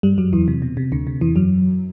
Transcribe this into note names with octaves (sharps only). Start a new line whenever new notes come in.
G2 G3
F#2 F#3
E2 E3
C3
B2
C3
D2 D3
C3
E2 E3
F#2 F#3